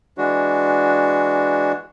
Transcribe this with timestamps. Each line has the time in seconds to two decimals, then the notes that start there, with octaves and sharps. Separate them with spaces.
0.18 E3 G#3 D4 F#4